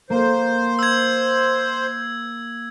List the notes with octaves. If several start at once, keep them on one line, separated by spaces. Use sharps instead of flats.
A#3 C5
E6 G#6